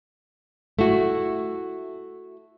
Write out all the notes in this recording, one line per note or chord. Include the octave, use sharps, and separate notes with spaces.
A3 E4 F#4